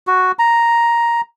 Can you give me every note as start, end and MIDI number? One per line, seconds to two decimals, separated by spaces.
0.07 0.32 66
0.39 1.21 82